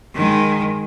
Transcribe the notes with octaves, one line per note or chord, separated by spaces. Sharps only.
D#3 G#3